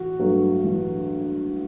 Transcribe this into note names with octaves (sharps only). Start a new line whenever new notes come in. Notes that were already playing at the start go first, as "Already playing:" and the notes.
Already playing: A1 F#4
G2 F#3 A3
A1